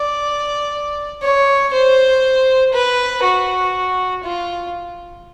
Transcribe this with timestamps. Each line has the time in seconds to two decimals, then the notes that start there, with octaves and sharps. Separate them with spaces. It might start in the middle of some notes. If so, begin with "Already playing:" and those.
Already playing: D5
1.23 C#5
1.73 C5
2.73 B4
3.23 F#4
4.24 F4